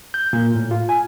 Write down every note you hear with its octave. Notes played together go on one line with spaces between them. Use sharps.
G6
A#2
A2
F4
G#5